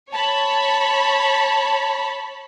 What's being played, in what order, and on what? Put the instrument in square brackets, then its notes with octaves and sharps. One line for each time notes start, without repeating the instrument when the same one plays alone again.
[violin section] C#5 A5 B5